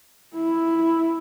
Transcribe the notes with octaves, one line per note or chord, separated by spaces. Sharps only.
E4